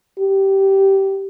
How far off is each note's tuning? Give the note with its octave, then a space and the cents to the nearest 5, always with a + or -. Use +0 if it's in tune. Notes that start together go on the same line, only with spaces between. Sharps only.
G4 -15